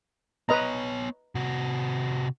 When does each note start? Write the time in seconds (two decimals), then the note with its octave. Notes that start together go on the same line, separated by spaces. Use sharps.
0.49 B3 B4 C#5 D#5 A#5
1.35 C3 F#4